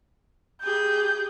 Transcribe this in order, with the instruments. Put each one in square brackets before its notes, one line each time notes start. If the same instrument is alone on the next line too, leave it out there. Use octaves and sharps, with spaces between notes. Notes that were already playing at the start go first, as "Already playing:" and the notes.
[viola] G4 G#4 [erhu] G6